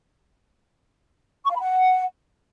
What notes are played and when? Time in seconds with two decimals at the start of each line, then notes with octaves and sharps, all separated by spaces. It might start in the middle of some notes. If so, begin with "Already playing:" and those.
1.45 C#6
1.50 F5
1.55 B5
1.60 F#5